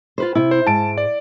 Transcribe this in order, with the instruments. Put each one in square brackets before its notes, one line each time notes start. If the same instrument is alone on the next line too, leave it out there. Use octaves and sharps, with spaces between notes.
[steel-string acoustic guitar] F4 B4 C5
C3 E4
[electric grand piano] C5
[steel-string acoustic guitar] G#2 [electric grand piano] A5 D7
[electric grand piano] D5